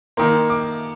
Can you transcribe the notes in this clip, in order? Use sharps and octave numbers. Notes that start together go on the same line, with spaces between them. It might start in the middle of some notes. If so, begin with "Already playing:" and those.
D#3 A#3 C6
D6